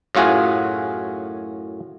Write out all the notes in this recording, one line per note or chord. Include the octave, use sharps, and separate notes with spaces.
F#2 A2 F4 F#4 G#4 G#5